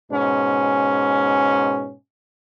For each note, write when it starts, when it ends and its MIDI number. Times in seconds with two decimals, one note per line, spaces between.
0.11 1.96 44
0.11 1.96 47
0.11 1.96 61